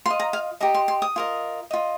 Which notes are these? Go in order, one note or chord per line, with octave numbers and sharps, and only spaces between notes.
F4 D#5 C6
A#5
F5
G4 D#5 A#5
C6
C6
D#6
F4 A#4 D#5
F4 D#5